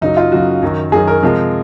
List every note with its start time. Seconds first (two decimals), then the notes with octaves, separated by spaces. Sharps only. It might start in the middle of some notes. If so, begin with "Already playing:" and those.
0.01 F#2 C#3 F#3 D#4
0.17 F4
0.32 F#2 C#3 F#3 F#4
0.62 F#2 D#3 F#3
0.92 F#2 D#3 F#3 G#4
1.07 A#4
1.23 C3 F3 G#3